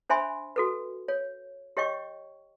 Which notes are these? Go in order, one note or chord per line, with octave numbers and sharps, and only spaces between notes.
D4 C5 E5 G#5 B5 C6
F#4 A4 B4
C#5
G4 C#5 D#5 G5 C#6